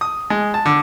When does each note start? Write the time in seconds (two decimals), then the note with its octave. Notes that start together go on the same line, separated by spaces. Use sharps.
0.01 D#6
0.30 G#3
0.54 A5
0.66 D3